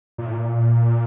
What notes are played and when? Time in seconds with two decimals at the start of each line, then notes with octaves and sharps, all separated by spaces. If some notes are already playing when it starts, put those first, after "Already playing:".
0.18 A#2
0.26 A2
0.33 A#2